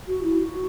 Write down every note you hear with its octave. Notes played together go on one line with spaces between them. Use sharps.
F#4
E4
F#4